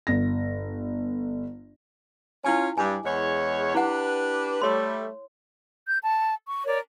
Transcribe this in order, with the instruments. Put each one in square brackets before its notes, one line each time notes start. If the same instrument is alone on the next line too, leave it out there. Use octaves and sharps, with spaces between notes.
[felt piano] G1 A#6
[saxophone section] C#4 F4 [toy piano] E4 G#5
[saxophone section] G2 [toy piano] G#5 D6
[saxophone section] E2 G#3 C#5
[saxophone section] D4 G4 B4 [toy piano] E4 F#5
[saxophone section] G3 A3 [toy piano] C#5 C6
[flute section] G6
A5
C#6
A#4 C#5 D5